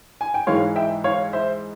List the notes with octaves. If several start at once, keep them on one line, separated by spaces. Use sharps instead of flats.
G#5
G5
G#2 E3 G#3 C#5 F5
E5 G5
C#5 F5
C5 E5